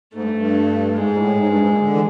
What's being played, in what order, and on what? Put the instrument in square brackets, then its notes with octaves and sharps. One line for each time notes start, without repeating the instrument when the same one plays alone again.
[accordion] G#2 [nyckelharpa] A3
[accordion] G2
G2
[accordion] G#2 [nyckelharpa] G#3
[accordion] A#2
A2
G#2
G2
G#2
A#2
D3
E3